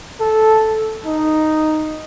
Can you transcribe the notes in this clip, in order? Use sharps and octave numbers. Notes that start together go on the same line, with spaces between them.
A4
D#4